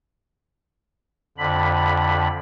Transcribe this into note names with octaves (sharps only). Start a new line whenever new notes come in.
F2 D3 B5